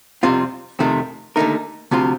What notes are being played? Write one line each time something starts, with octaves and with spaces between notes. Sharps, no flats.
F2 C3 G3 C4 F4
F2 C3 D#3 A3 C4
D#2 D3 A3 D#4 A#4
D2 C3 F3 C4 F4